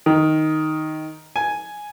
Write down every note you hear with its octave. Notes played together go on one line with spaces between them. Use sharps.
D#3
G#5